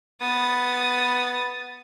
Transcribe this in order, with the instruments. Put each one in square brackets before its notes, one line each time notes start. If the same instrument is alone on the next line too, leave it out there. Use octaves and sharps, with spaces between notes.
[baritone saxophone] B3 [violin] D#6 A6